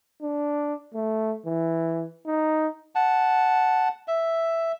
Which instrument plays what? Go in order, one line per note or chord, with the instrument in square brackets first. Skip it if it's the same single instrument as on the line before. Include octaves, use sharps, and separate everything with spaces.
[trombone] D4
A3
E3
D#4
[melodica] F#5 A5
E5